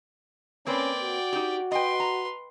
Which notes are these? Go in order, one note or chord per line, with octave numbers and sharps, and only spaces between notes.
A#3 C4 C#4 B4 D5 G5
F#4
D#4 G4
B4 D#5 G5 C6
A#5